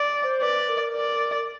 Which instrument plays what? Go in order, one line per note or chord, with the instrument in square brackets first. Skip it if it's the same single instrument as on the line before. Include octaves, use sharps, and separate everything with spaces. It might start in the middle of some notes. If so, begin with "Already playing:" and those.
Already playing: [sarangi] D5
[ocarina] C5
[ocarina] B4 [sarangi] D5
[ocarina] A#4
[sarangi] D5